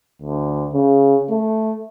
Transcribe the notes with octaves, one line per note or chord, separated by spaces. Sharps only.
D2
C#3
A3